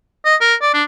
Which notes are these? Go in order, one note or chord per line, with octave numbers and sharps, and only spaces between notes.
D#5
A#4
D5
D4